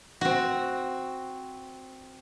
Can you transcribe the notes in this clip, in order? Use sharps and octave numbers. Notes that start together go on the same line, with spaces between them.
C4 F#4